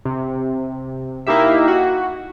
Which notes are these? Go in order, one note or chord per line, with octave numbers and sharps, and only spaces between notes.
C3
A#3 D#4 E4 G4 E5
F#4